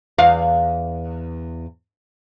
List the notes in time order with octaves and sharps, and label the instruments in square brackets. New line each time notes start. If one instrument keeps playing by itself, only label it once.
[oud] E2 F5